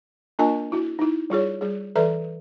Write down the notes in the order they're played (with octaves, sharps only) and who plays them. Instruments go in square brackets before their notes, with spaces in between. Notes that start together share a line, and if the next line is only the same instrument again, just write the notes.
[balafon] A#3 D4 F4 A#4 D#5 G#5
E4 F#4
D#4 E4
G3 F4 G#4 C#5
G3 G#4
E3 A4 B4 D5 E5 A#5